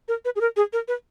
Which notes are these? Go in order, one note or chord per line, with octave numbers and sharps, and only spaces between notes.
A#4
B4
G#4
A#4
G#4
A#4
B4